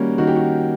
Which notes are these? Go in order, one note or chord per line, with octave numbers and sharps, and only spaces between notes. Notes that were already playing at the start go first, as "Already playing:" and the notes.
Already playing: D#3 G3 A#3 C#4 F#4
D#3 F#4
G4
F#4